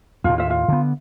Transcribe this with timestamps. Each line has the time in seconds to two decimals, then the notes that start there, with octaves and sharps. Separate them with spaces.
0.24 D#2 A2 F4
0.38 F4 E5
0.50 F4
0.68 D3 B3